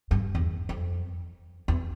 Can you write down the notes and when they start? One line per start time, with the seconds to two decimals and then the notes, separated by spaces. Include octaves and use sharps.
0.11 G2
0.35 E2
0.69 F2
1.68 E2